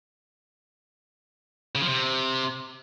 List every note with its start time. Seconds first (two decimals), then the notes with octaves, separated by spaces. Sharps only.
1.75 C#3
1.82 F3
1.88 C3